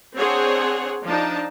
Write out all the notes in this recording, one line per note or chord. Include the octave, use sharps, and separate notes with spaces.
C4 D4 G#4 C5 C#5 F#5
F3 D4 D#4 A5